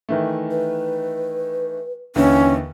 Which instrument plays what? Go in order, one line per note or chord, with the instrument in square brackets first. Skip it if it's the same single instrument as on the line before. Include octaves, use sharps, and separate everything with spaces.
[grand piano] D#3 E3 A3
[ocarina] B4
[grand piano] D#2 D3 E3 [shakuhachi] C#4